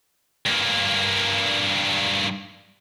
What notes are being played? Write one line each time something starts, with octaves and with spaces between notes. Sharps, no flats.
G2 A#3